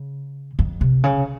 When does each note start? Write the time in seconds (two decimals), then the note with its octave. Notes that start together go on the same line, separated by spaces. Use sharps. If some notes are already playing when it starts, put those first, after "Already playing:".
Already playing: C#3
0.59 F2
0.81 C3
1.04 C#3